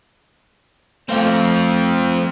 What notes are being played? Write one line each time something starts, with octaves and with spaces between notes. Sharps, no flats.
F3 A3 C4 F5